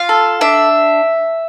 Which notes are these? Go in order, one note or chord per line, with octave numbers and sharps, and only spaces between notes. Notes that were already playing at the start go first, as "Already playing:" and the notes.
Already playing: F4 F5
A4
D4 E5